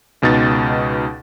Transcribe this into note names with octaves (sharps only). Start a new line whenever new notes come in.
C#2 B2 D#4 A6